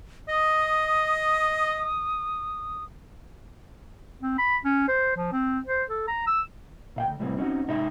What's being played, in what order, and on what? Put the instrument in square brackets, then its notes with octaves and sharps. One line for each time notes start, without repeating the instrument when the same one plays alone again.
[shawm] D#5 [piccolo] D#6
[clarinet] C4
B5
C#4
C5
F3
C4
C5
A4
A#5
E6
[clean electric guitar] A#2 F5 G5
D2
C2 A2 C3 G3 B3 C4
C4 C#4 D#4 F#4
G#2 C3 D#4 G4 E5 B5